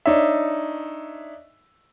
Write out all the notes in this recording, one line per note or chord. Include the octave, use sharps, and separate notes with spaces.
D4 D#4 C#5 E5